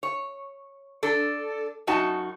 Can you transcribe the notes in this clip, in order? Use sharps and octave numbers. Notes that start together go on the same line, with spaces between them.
C#5
D4 A4
F#2 D#4 F#4 A5